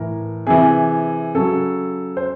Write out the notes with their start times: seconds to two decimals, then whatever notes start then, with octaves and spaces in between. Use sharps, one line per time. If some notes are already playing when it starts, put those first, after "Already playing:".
Already playing: A2 E3 A#4
0.46 C3 E3 G#4
1.34 C#3 F#3 A4
2.17 C5